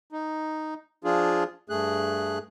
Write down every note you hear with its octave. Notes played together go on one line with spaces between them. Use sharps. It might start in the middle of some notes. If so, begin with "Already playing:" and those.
D#4
F3 D4 F4 G#4
G2 A3 G#4 F#6